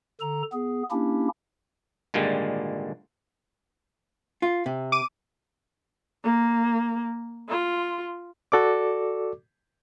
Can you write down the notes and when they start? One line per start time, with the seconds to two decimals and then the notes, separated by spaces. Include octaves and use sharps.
0.21 D3 A4 A#5
0.53 B3 G#4
0.91 A#3 C#4 D4 E4 G4
2.14 G#1 A#2 D3 G3 G#3
4.42 F4
4.66 C3
4.92 D6 D#7
6.24 A#3
7.49 F4
8.52 F#4 A4 D5 D6